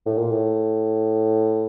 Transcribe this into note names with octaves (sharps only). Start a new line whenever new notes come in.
A2
A#2
A2